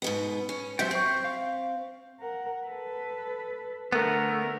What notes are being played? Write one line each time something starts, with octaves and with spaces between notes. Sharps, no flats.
G#2 B2 B3
C#4
C3 F#3 C5 E5 G5
C4 C#6 G6
F5
A#4 F#5
A4 B4
D3 A3 B3 A#4